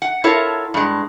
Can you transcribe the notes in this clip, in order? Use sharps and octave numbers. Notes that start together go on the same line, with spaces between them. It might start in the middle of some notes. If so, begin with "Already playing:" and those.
F#5
E4 F4 A4 A#4 C#5
G2 G#3